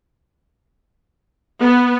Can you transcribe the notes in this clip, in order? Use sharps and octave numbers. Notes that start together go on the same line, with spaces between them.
B3